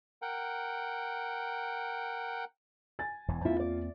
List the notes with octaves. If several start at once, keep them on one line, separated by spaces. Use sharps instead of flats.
A#4 F#5 G5
G#5 A6
E1 E2 E3
E2 A#3 C4 E4 F4
D5